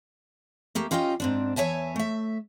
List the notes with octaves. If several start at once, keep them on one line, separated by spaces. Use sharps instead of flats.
A3 A#3 G4
C#4 F4 G4 D#5 F#5 G5
G#2 C4 D4
E2 C#5 E5 G#5 A5
A3 E5